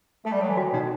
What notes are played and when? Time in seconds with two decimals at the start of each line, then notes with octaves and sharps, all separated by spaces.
0.25 A3 A4
0.33 G3
0.41 F#3 A4
0.49 E3
0.57 D#3 F#4
0.73 B2 D#4